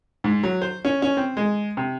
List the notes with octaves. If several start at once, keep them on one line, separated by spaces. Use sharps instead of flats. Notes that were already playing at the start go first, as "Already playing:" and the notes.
G#2
F#3
C5
C#4
C#4
C4
G#3
C3